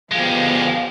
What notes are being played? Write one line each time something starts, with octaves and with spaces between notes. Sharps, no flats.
D2 F3 G#3 B3 G4 F5